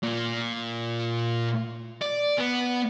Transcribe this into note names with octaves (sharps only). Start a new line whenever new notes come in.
A#2
D5
B3